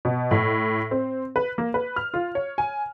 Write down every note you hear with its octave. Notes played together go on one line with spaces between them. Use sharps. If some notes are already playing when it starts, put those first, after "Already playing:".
B2
A2
C4
B4
A#3
B4
F6
F4
C#5
G#5